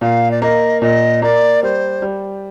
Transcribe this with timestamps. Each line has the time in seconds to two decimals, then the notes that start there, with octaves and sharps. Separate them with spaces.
0.01 A#2 F5
0.31 D5
0.42 A#3 D#5
0.82 A#2 D#5
1.22 A#3 D5
1.63 G3 C5
2.02 G3